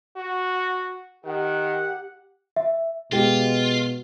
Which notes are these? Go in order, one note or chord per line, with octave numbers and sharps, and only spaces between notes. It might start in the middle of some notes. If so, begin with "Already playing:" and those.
F#4
D#3 G4 F#5
E5
B2 G#3 F4 G4